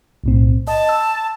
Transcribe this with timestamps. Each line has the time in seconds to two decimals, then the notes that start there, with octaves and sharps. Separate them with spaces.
0.24 B1 A2 C4
0.68 D#5 A5
0.89 E6